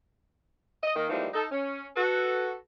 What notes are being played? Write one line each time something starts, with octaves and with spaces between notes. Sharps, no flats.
D#5
D#3 A#3
E3 F3 G3 G#3 A#3 D#4
D#4 A4
C#4
F#4 A4 B4